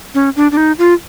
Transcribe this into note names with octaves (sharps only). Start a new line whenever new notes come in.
C#4
D4
D4
D#4
F4